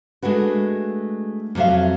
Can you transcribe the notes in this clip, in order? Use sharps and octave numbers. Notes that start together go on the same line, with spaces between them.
G#3 A3 D4 F#4 B4
F2 C3 F#3 E5 F5